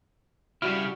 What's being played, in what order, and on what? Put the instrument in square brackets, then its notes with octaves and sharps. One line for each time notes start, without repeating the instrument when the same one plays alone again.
[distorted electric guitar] C#3 [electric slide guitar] G3 E4 [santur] F#4 D5 [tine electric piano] F6